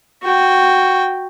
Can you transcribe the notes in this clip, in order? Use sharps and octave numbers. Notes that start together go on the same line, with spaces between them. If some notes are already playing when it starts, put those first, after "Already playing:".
F#4 G5